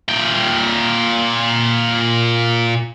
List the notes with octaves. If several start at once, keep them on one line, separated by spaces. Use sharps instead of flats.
A#2 G5